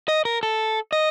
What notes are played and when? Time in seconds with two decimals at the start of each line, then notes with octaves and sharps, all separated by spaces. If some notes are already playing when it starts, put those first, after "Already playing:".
0.08 D#5
0.25 A#4
0.43 A4
0.93 D#5